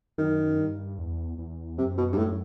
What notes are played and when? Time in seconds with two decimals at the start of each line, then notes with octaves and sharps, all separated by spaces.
0.18 F#2 D#3
0.59 G2
0.98 E2
1.38 E2
1.78 F#2 C3
1.98 B2
2.13 G2
2.18 F#2 A2